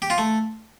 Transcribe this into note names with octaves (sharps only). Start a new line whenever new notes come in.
G4
F4
A3